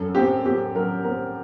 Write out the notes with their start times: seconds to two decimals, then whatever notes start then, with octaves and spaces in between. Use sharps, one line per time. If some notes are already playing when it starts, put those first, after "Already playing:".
Already playing: F#2 A4
0.15 C4 G4
0.45 C4 G4
0.75 F#3 A#4
1.04 C4 A#4